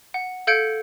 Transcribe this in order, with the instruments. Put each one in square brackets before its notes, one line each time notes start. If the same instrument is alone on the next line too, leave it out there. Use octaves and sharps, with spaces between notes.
[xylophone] F#5
A4 F5 G6 G#6 C#7 D7